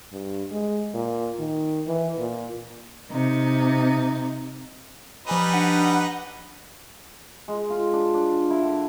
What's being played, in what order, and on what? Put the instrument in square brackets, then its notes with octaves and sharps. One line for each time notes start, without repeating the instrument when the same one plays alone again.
[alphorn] G2
G#3
A#2
D#3
E3
A#2
[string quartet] C3 D#4
[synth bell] F3 G#5 D#7 [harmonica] G3 D#4 B4
[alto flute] D4 [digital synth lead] F#5
[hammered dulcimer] G#3
F4
D4
D4
E4
D3